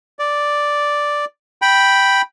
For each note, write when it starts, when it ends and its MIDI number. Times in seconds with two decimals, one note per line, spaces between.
0.19 1.25 74
1.62 2.22 79
1.62 2.22 83